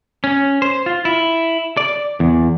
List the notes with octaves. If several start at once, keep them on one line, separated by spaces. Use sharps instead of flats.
C#4
C5
F4
E4
D5
E2